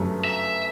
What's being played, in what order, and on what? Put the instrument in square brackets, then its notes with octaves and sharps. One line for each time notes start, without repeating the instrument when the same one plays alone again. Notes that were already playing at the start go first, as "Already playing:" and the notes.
Already playing: [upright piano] G1 F#2 C#3 F#3 A3
[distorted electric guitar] E5